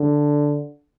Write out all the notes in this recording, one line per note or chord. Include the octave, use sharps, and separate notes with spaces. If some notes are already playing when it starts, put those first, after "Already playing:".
Already playing: D3